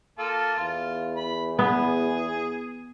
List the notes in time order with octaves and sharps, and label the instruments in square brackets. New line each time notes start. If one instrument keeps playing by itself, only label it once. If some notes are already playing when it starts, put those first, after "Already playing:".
[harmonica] A#3 F4 A4
[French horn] E2 [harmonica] F4
[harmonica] B5
[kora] B3 [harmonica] G#4